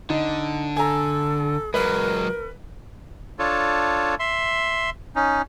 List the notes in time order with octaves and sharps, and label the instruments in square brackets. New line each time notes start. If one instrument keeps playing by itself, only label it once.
[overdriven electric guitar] D3 [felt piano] D#4
[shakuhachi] A4 [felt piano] G#5 A#5
[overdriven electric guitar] F#3 G#3 [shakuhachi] A#4 [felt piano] B4
[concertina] D4 F4 A4 C#5
E5 C6
C#4 D#4